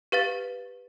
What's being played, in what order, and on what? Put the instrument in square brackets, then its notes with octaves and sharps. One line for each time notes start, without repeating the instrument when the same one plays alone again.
[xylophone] G4 B4 F5 A6